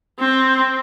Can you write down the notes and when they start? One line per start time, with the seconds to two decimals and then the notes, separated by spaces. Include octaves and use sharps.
0.19 C4